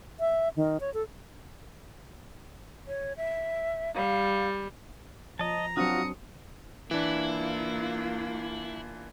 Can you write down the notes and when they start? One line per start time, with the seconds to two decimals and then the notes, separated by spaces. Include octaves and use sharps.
0.20 E5
0.56 D#3
0.80 C#5
0.94 A4
2.87 C#5
3.17 E5
3.95 G3 F5
5.39 F3 D#5 A5 A#5
5.77 F#3 C4 D4 F4 F#4 D#6 C#7
6.91 E3 A#3 D4 E4 F4